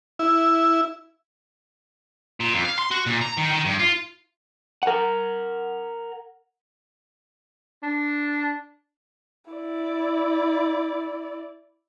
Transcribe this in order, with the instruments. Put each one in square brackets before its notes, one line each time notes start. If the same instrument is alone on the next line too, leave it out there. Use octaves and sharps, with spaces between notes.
[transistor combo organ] E4
[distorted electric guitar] A#2
F2
F5
C6
F#4
A#2
A#5
D#3
D#3
G2
F4
[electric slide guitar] A#4 F#5
[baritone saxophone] D4
[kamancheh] E4 D5